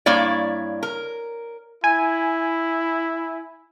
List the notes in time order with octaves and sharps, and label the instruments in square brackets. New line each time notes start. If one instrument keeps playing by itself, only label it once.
[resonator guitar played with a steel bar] G2 A#3 E4 C#5 D5
A#4
[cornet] E4 [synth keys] G#5